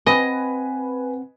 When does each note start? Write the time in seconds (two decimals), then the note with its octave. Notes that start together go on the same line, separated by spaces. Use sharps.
0.06 C4 B4 D#5 F#5 G#5 B5